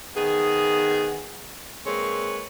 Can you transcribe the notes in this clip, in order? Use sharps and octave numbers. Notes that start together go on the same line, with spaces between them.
D#3 B3 G#4
G#3 A#3 C4 B4 C#5